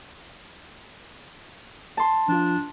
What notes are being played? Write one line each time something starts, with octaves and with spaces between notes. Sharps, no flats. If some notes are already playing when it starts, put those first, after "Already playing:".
A5 C6
F3 D4 F4